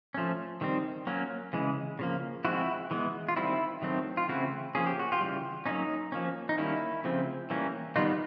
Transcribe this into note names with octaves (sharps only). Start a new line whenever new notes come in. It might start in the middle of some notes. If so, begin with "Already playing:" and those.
F3 A3 C#4
D#3 G3 C4
F#3 A#3 C#4
C#3 E3 G#3
C#3 F3 A#3
F3 G#3 C4 E4 F#4
E3 G#3 B3
F4
D#3 G3 C4 E4
D#3 F#3 A3 C4
F4
C#3 E3 A3 C4 E4 F#4
F3 A#3 C#4 G#4
G4
F#4
F4 G4
C#3 E3 G3
F#3 A#3 C#4 D#4
F3 A#3 C#4
D#4
D#3 G3 A#3 C#4 E4
C#3 F3 A3 C4
E3 G3 A#3 C#4
D#3 G3 B3 D#4 F4